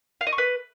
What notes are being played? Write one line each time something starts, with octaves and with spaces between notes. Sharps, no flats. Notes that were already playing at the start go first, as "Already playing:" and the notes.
F5
D#5
C#6
B4